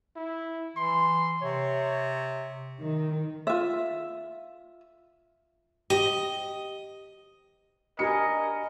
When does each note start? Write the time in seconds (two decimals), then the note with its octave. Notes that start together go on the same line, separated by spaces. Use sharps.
0.16 E4
0.77 E3 C6
1.42 C3 C#5
2.81 D#3
3.47 F4 E5
5.90 G4 D#5
7.99 D4 G4 A#4 B4 D#5 G#5 C#7